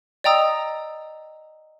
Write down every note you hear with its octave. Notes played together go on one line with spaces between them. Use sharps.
D5 D#5 G5 A#5 D#6 E6